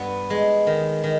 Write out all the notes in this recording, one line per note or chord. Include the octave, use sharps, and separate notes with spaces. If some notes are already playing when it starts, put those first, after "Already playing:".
Already playing: G2 B3
G#3
D#3
D#3